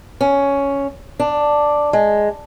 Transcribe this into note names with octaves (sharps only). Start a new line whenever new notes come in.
C#4
D4
G#3